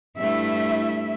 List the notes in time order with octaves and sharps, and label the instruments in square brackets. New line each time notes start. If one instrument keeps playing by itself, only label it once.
[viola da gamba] G2 A3 [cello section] E4 E5